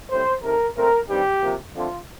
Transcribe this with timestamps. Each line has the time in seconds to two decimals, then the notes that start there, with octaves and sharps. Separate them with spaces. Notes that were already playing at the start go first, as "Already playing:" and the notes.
0.09 A2 G3 C4 C5
0.43 C3 D#3 A3 A#4
0.76 A#2 A3 C4 A#4
1.08 G2 D#3 G3 C4 G4
1.41 C3 F3 A#3
1.74 D3 F3 A3 C4 F4